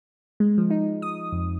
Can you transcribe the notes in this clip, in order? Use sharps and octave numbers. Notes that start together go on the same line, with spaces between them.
G#3
F3
D#4
D#6
F2